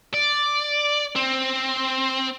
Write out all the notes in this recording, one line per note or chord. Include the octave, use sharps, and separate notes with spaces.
D5
C4